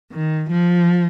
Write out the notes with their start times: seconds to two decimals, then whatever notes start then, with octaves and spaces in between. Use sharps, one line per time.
0.11 D#3
0.50 F3